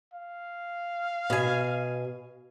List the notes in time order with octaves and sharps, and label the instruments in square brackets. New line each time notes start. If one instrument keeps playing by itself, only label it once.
[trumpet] F5
[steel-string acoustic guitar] B2 G#5